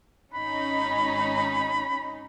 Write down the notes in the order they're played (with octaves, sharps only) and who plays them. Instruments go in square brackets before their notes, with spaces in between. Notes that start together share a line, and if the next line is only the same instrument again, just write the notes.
[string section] G#1 C#4 D#4 [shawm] B5